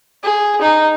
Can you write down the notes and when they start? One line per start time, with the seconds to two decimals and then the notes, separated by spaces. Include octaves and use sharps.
0.23 G#4
0.61 D#4